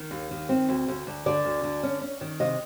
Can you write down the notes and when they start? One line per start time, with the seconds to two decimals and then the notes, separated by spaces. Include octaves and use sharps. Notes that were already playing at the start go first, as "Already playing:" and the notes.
Already playing: D#3
0.11 D#2
0.31 D#3
0.49 C4
0.69 D2
0.88 D2
1.07 D2
1.26 D3 D5
1.45 D2
1.63 D3
1.83 C#4
2.02 C#4
2.21 D#3
2.40 C3 D#5